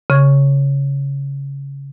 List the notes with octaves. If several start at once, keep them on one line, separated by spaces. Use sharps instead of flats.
C#3 C#6 G#6